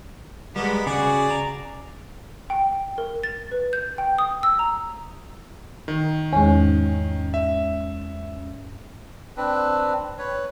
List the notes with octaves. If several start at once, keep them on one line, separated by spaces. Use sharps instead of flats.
G3 G#3 A#3 B3
C#3 F#4 G#4 D5
A#5
G5
A#4
A6
B4
G6
G5
D#6
E6
A#5
D#3
E2 G#2 C#4
E5
C4 D4 B4
B4 C#5